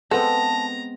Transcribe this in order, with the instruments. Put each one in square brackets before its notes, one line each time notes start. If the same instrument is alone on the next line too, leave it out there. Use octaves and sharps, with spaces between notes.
[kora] G#3 B3 C4 [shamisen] A4 [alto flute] A5 [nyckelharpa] A#5